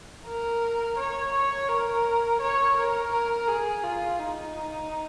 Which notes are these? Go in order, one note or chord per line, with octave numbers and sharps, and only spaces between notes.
A#4
C#5
C#5
A#4
C#5
A#4
A#4
G#4
F4
D#4